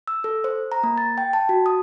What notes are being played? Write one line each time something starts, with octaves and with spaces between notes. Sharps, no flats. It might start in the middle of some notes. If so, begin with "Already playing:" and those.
E6
A4
C5
A#5
A#3
A6
G5
A5
F#4
D#6